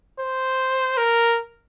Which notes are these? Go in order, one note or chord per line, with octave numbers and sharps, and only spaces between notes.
C5
A#4